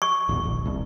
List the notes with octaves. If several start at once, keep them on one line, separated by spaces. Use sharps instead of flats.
C#6
D1 G#1 E2
D#1 A#1
D#1 C2